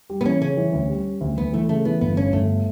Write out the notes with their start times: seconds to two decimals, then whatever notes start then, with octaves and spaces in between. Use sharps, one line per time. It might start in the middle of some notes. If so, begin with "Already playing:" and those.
0.10 G3
0.21 B3
0.25 E3 C#4
0.41 C#3 C#4
0.57 E3
0.73 D2
0.89 G3
1.05 G3
1.21 D2
1.38 D2 B3
1.53 E3 A3
1.69 C#3 A3
1.85 E3 B3
2.01 G1 B3
2.17 G1 C#4
2.33 G1 A3